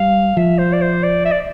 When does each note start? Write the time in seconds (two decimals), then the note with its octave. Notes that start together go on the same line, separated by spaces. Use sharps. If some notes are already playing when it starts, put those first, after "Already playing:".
Already playing: G3 F5
0.37 F3 E5
0.58 C5
0.73 D5
0.81 C5
1.03 D5
1.25 E5
1.32 D5